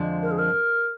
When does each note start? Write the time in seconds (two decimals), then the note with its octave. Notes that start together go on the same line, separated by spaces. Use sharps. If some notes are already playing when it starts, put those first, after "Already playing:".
Already playing: F2 D3 F3 G#3
0.22 A#4
0.31 G#4
0.39 A#4